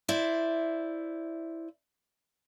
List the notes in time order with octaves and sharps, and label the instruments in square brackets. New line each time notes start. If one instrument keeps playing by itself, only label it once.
[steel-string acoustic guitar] E4 C5 D5